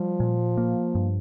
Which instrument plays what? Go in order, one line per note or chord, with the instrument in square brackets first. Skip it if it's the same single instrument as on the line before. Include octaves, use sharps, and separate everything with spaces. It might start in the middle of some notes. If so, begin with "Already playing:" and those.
Already playing: [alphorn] F3 [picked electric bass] G3
[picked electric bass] A#2
A#3
G2